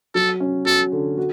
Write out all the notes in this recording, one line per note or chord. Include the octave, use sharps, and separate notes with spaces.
F#3 A4
C#4
F#4 A4
D3
F#4